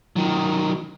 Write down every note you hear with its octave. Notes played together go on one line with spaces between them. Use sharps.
D#3 F#3